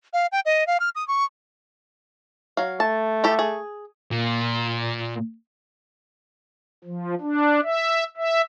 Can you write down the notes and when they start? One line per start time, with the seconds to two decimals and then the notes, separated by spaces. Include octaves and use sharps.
0.13 F5
0.32 G5
0.45 D#5
0.67 F5
0.80 F6
0.95 D#6
1.08 C#6
2.57 F#3 F5
2.80 A3 A5
3.24 E4 G4 A4
3.39 G#4
4.11 A#2
6.84 F3
7.21 D4
7.64 E5
8.17 E5